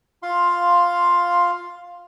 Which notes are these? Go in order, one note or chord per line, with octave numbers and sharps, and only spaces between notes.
F4 F5 C6